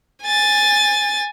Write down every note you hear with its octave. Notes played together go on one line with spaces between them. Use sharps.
G#5 A6